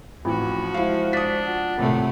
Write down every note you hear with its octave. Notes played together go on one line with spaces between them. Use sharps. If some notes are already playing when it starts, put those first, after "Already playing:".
A1 F2 F3 F#4 B5
G#3 E4 C5 F5
D4 D#6 B6
F4 F#5
G#1 A2 C3 A3